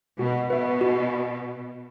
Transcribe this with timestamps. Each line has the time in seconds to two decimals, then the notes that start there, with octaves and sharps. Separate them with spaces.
0.19 B2 F#4
0.50 B2 B4 E5
0.81 F#4